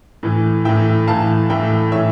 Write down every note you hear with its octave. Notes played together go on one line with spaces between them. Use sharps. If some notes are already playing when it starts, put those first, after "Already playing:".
A2 E3
A2 E3 E5 G5
A2 E3 F5 A5
A2 E3 E5 G5
A2 E3 C#5 E5